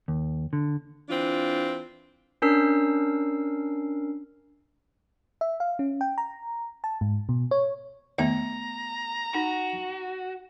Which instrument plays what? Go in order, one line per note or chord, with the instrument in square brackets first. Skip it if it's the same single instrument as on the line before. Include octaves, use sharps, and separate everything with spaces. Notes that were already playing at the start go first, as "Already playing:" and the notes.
[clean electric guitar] D#2
D3
[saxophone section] E3 C4 D4 F4
[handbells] C#4 D4 A#4 E6 C7
[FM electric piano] E5
F5
C#4
G5
A#5
A5
G#2
B2
C#5
[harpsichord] D#2 [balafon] A3 B3 E5 [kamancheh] A#5
[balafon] D#4 [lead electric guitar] F#4